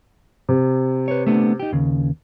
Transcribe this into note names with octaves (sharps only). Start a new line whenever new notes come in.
C3
B4 C#5
A3 B3 D4
D#4 G4
D#2 C#3